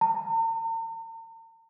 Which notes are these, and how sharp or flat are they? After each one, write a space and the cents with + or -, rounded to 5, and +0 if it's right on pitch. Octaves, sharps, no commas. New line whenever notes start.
A#5 -45